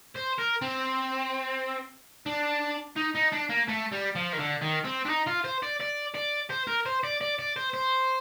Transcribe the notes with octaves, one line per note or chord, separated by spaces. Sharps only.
C5
A#4
C4
D4
D#4
D#4
D4
A#3
A3
G3
F3
D#3
D3
D#3
C4
D4
D#4
F4
C5
D5
D5
D5
C5
A#4
C5
D5
D5
D5
C5
C5